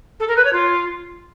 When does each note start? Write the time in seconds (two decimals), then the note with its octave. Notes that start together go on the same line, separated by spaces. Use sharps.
0.20 A4
0.28 A#4
0.36 B4
0.45 C#5
0.53 F4